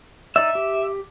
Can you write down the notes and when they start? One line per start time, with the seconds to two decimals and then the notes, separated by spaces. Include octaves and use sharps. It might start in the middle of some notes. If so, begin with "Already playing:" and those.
0.36 D#4 D5 E5 E6
0.55 G4